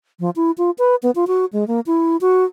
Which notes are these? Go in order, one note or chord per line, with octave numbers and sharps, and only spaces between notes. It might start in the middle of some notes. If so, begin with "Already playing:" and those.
F3
E4
F4
B4
B3
F4
F#4
G#3
A#3
E4
F#4